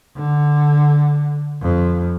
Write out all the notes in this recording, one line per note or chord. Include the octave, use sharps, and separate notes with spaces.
D3
F2